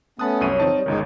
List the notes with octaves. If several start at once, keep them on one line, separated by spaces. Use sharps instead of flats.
A3 B3 C#4 A5 B5 D#6 F#6
C2 F#2 C#5 F6 D#7
G2 D3 F3 C4 D#4 A5
G3
G1 C#2 D#3 G#3 D#4